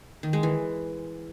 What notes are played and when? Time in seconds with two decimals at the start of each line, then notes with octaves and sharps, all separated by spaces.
0.23 D#3
0.33 G#3
0.43 E3